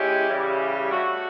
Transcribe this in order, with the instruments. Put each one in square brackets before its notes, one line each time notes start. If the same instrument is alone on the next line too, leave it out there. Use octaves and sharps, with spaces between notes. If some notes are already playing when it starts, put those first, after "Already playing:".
Already playing: [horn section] G#3 C#4 E4 G4
C#3 E3 G3
A3 D4 F#4